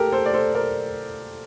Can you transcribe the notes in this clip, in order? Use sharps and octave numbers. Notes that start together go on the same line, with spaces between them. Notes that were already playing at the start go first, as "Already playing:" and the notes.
Already playing: G4 A4 A#4
A4 C5
D5
A4 C5
A#4 D5